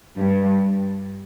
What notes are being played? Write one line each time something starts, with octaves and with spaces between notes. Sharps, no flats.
G2